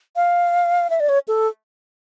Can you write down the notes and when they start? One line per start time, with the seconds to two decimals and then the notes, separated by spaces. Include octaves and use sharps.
0.16 F5
0.90 E5
1.00 D5
1.09 C#5
1.28 A4